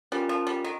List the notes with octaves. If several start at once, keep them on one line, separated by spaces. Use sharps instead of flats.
G3 C#4 F4 A#4
F3
G3
D#3